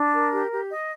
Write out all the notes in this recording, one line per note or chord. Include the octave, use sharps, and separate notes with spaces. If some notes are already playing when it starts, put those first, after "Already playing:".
Already playing: D4
A#4
G4
G4
D#5